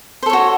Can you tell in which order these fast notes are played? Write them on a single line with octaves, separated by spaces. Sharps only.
C5 A4 C#5 F#4